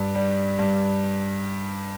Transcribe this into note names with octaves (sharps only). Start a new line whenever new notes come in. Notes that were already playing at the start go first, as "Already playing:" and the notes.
Already playing: G2
G3
G2